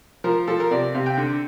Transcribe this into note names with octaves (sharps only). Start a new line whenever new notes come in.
F3 A#4
F3 A4
A#4
C3 D5
C3 F5
G5
D3